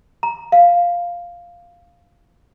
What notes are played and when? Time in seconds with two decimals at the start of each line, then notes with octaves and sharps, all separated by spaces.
0.23 A#5
0.52 F5